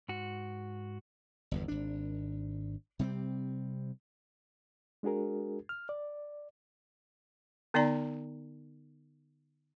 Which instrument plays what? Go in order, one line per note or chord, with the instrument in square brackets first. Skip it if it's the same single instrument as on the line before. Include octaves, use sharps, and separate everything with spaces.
[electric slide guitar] G#2 F#4
[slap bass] G1 E2 G2
G#1 D4
C3 G3 B3 C4
[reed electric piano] G#3 D4 F#4 G#4 A#4
F6
D5
[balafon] D3 B3 D#4 D5 A#5